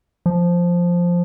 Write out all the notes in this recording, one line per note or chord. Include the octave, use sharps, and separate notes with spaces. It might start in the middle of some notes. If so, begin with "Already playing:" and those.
F3